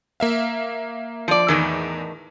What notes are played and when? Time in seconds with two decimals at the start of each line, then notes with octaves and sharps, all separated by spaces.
0.20 A#3 E5 F5
1.28 F3 D5
1.48 E2 A2 D#3 E3